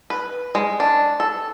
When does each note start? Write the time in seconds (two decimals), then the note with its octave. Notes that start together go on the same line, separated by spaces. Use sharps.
0.10 B4
0.55 G#3
0.80 D4
1.20 A4